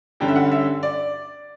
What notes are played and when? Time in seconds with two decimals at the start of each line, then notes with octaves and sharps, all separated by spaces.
0.20 G2 D3 G3 C#4 G5
0.28 E5
0.36 F#5
0.52 E5
0.83 D5